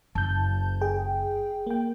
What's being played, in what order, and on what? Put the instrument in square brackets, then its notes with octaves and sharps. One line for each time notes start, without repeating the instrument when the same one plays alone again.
[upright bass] F#1 [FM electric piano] A5 G6
[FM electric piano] G#4 G5
A#3 G5